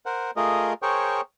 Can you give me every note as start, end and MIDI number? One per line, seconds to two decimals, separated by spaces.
0.06 0.31 70
0.06 0.31 72
0.06 0.31 78
0.36 0.73 57
0.36 0.73 65
0.36 0.73 68
0.36 0.73 70
0.36 0.73 75
0.82 1.21 68
0.82 1.21 70
0.82 1.21 72
0.82 1.21 73
0.82 1.21 79
0.82 1.21 85